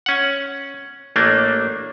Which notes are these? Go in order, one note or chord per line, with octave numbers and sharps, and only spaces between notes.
C#4 F#5
A1 A3 A#3 D4